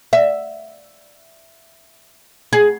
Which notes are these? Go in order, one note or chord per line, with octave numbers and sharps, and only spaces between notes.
E5
G#4